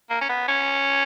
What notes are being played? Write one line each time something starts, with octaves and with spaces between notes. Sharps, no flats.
A#3
C#4
B3
C#4